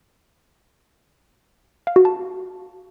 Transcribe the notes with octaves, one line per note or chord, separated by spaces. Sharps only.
F5
F#4
A5